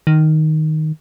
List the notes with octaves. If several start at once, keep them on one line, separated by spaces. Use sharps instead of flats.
D#3